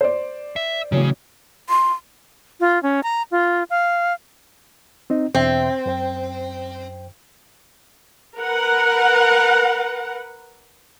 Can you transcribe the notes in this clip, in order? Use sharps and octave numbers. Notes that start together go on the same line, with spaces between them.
C5 D5
E5
A1 C#3 F#3
C6
F4
C#4
A#5
F4
F5
C4 D#4 D#5
E2 B2 C4 E5
F#2 C5 G5
A#4 B4 F#5